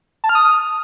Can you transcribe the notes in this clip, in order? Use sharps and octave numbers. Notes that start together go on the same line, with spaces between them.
A5
F6
D#6